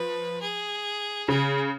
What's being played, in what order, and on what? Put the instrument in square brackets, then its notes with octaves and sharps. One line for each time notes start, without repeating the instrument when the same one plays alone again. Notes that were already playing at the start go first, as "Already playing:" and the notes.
Already playing: [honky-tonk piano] F3 [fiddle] B4
[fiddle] G#4
[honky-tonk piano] C#3 [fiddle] G#4